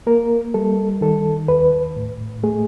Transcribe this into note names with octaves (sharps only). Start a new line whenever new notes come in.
A#3 A#4
G3 A4
D#3 A4
D#2 B4
A2
A3 G#4